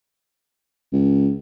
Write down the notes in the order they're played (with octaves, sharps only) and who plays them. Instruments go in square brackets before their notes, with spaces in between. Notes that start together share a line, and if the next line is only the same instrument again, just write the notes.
[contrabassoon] C#2